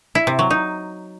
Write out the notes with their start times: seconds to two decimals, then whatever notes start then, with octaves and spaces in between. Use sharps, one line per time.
0.15 E4
0.27 C3
0.39 F#3
0.50 D#4